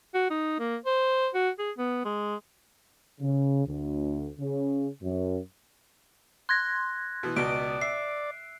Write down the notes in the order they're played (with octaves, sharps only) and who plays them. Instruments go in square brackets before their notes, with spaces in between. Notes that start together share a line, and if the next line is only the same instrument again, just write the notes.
[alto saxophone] F#4
D#4
A#3
C5
F#4
G#4
B3
G#3
[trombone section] C#3
D2
C#3
F#2
[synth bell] C6 G#6 A#6 [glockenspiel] F#6
[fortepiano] B2 E3
[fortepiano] C#2 B2 D#5 [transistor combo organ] D5 [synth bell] D7
[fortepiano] E5 [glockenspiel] C7